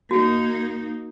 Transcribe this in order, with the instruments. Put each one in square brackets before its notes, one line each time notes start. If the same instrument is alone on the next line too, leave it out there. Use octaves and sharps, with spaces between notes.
[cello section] A#3 D#4 [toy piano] F#4